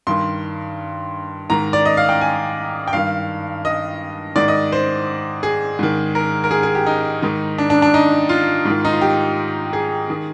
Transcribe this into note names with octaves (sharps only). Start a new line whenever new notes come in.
G2 D#3 C6
G#2 D#3 A#5
D5
D#5
F5
G5
G#5
G5
G2 D#3 F5
D#5
G#2 D#3 D5
D#5
C5
G#4
G#2 D#3
A#4
A#4
G#4
G#4
G4
D#4
G#2 D#3
D4
D4
D4
D#4
F4
G#2 D#3
D#4
F4
G4
G#4
D#3